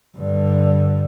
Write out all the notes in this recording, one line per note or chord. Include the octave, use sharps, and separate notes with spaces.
G2 D3